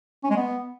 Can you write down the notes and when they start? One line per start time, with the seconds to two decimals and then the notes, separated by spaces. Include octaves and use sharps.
0.24 C#4
0.30 G#3
0.36 B3